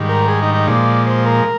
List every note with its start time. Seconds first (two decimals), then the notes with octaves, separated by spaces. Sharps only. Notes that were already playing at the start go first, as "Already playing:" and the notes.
Already playing: G#2 D#3 G3
0.09 A#4
0.28 G#4
0.42 D#4
0.55 D#4
0.67 A#2 F3 G#3 D5
1.06 C5
1.26 A#4